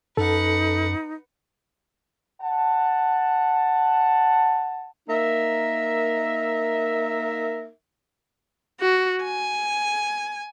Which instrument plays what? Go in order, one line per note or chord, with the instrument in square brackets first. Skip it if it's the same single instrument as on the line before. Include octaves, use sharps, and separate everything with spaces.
[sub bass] F#2 [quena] D#4 [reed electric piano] A4 [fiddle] B4 F#5
[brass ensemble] F#5 A5
[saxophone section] A#3 D#4 A#4 E5
[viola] F#4
G#5